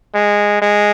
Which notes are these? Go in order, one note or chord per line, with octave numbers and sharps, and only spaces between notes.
G#3
G#3